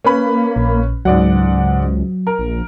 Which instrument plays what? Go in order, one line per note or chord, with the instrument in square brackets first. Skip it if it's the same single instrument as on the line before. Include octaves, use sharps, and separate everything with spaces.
[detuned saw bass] A#3 [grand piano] C#4 B4 B5
[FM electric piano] A#1
[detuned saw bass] C#2 [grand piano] G#2 D5 F#5 [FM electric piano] F#3
[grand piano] A#4
[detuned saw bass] A#1